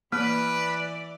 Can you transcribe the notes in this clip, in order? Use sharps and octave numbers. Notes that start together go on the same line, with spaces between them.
E3 A#3 B4 D5